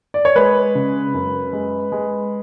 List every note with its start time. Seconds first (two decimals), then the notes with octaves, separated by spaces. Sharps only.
0.14 D5
0.25 C#5
0.35 G#3 B4
0.75 C#3
1.14 F#2
1.53 G#3
1.92 G#3